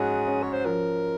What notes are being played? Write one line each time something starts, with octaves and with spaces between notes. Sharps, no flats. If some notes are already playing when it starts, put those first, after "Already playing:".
Already playing: G#2 C#4 F#4 G#4
C#4
C#5
C5
F3 A#4